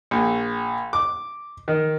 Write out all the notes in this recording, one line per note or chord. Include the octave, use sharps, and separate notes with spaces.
A#1
D6
D#3